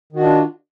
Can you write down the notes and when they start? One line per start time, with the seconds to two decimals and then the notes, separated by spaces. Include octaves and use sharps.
0.12 D#3
0.16 F#4
0.20 D4
0.24 F4